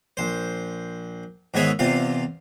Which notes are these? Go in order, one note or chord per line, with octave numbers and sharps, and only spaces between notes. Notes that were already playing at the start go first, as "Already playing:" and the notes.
A#1 C5
G#2 D#3 B3 G#4 C#5 E5
E2 C3 F4 F5